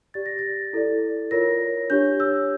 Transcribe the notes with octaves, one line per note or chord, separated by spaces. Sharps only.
G4 D5 A6
A#6
A6
E4 A4 D5
F4 A#4 C#5 A#6
D4 G4 C#5 G6
E6